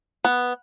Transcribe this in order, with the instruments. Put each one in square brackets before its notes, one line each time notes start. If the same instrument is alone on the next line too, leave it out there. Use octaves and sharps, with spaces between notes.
[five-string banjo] B3